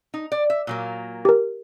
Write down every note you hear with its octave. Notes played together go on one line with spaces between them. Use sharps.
D#4
D5
E5
A#2 F#3 A#3
G4 A#4